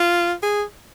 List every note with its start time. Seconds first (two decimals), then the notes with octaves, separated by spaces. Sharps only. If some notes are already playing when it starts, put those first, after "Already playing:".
Already playing: F4
0.43 G#4